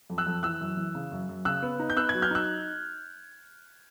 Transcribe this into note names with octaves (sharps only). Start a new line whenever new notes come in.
F2
E6 F#6
F2
E3 E6 F#6
F#2
E3
C#3
F#2
F#2
C#3 E6 F#6
B3
D#4
G6
B3 E6 F#6
F#6 G#6
F#3
F6 G6
D#4 E6 F#6